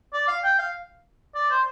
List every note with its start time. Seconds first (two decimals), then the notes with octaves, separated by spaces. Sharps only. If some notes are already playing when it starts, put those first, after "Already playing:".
0.14 D5
0.28 F5
0.44 G5
0.59 F5
1.35 D5
1.50 C5